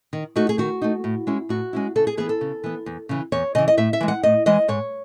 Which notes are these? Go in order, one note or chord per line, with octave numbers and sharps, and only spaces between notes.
D#3
A3 D#4 F#4
G#4
D#3 F#4
A3 D#4
A2
G#3 C#4 E4
A2 F#4
G#3 C#4 E4
C#3 A4
G#4
E3 B3 G#4
A4
C#3
E3 B3
E2
C#3 E3
E2 C#5
C#3 E3 D#5
D#5
A2 E5
E5
E3 G#3
F#5
A2 D#5
E3 G#3 D#5
G#2 C#5